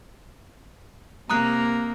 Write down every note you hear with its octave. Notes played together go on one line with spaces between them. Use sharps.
C3 A#3 A#5 D#6 F#6